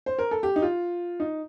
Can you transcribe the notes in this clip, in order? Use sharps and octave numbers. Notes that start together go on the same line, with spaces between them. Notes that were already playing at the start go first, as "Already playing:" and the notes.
C5
A#4
A4
G4
D#4
F4
D#4